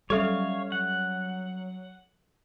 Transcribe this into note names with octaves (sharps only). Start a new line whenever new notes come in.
F#3 G3 C#4 A4 C#5 E5 F5
F#3 F#5